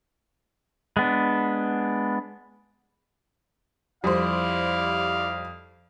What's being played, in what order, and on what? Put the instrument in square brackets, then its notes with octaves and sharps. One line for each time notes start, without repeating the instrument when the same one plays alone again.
[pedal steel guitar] G#3 B3 D4
[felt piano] F2 [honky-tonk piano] G3 C5 [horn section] E4 D5 [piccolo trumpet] F5